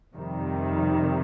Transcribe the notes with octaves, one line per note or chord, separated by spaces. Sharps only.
F2 C3 D#3 G3